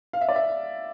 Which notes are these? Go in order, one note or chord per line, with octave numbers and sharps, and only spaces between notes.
F5
E5
D5
E5